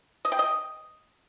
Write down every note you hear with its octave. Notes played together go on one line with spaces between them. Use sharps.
D#5
G5
D#5